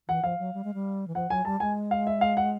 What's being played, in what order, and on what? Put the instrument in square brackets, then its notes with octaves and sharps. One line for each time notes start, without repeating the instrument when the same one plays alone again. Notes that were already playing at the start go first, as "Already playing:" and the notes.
[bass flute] E3 [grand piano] F#5
[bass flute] F3 [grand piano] F5
[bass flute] F#3
G3
G#3
G3
E3
[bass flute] F3 [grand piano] F#5
[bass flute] F#3 [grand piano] G#5
[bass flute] G3 [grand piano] A5
[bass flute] G#3 [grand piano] G#5
[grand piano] F5
E5
F5
F#5